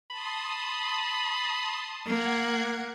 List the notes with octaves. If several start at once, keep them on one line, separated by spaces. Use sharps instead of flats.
A5 B5 C6 D#6
A#3 F#5 F#6 G#6